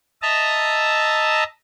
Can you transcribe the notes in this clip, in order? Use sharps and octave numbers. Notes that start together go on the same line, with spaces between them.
D#5 E5 A5 A#5